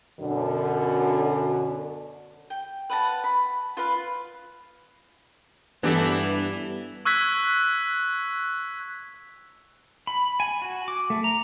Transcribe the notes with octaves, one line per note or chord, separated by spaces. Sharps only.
F#2 B2 D3
G5
B4 F#5 A5
B5
F4 B4 F5
G2 E3 B3 D4 E4 G4 A4
C#6 E6 F#6 G#6 B6
B5
G#5
F#4
D6
A3
A#5